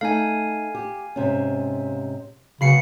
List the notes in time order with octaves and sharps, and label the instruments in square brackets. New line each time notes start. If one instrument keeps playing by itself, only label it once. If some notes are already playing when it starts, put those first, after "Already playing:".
[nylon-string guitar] A3 D#4 [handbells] F5 G#5
[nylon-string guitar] G4
G#2 C3 C#4
[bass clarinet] C#3 [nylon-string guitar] F#3 B3 [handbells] B5 C7 C#7